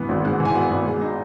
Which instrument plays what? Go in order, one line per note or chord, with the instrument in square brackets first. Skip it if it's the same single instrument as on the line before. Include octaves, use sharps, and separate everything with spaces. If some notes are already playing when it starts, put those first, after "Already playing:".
Already playing: [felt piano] G#2 E3 B3
G#1
G#2 F#5
E3
G#5
B3 F#5
G#1
G#3
D#4